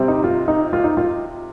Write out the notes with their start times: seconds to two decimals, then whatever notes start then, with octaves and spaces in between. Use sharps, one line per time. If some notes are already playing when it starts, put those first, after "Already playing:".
Already playing: C3 G3 C4
0.08 D#4
0.24 F4
0.48 D#4
0.73 F4
0.84 D#4
0.97 F4